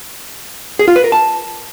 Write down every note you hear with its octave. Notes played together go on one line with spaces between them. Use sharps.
G#4
F4
B4
A#4
A5